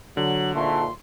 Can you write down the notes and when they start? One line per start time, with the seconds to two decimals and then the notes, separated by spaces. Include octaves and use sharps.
0.17 D3 F#3 F#7
0.55 G#1 A#2 A3 C6